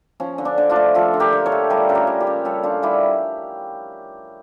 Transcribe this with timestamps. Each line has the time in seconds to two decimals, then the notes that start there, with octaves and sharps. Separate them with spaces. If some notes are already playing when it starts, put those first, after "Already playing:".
0.20 F3 C#4
0.38 D3
0.45 D4
0.58 D3
0.69 D4 F4
0.76 A3
0.95 F3 F4 A4
1.14 D3
1.20 G4 A#4
1.33 D3
1.46 A4 C#5
1.52 A3
1.70 G3 G4 A#4
1.89 C#3 A4
1.95 G4 A#4
2.07 G3
2.20 G4 A#4
2.27 C#3
2.45 G3 A4 C#5
2.63 C#3 D4 F4
2.83 G3 E4 G4